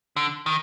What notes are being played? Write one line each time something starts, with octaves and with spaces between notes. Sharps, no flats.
D3
D#3